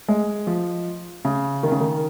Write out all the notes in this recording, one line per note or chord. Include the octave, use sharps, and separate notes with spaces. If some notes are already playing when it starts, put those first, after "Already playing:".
G#3
F3
C#3
D#3
C#3
D#3